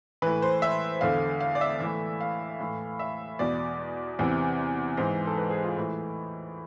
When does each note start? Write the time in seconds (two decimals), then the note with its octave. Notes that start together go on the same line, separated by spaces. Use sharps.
0.22 A2 E3 B4
0.42 C5
0.62 E5
1.01 E2 D3 F5
1.40 F5
1.55 D5
1.61 E5
1.80 A2 E3
2.20 F5
2.60 A2 E3
2.99 E5
3.39 E2 B2 D5
4.19 E2 C3 E3
4.97 G#2 E3 C5
5.27 A4
5.38 B4
5.50 G#4
5.63 F4
5.77 A2 E3